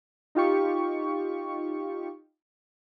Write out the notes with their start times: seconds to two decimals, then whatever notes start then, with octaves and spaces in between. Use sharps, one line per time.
0.35 D#4 F4 G4 C#6